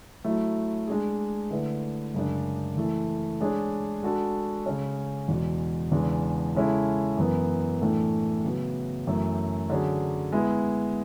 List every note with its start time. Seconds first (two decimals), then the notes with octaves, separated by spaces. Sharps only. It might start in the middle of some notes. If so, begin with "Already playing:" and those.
0.24 F#3 A3 E4
0.87 G#3 D4 G#4
1.51 D3 A3 E4 B4
2.14 F#2 C#3 G#3 D4
2.77 E3 A3 E4 A4
3.40 G#3 D4 G#4 C#5
4.03 G#3 D4 F#4 A4
4.66 C#3 G#3 C#4
5.28 E2 B2 G#3
5.92 E2 C#3 G#3 B3 D4
6.55 C#3 G#3 C#4 E4 A4
7.17 F#2 E3 B3
7.81 A2 E3 A3 D4 A4
8.43 C#3 F#3 B3
9.07 F#2 E3 A3 C#4 F#4
9.70 D3 F#3 C#4 G#4
10.33 G#3 B3 E4